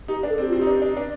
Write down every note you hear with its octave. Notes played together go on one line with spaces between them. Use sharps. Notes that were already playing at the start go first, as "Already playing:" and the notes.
D#4 G4
D4
A4
C4
G4
F4
C4
D#4 G4
D4
D4
D4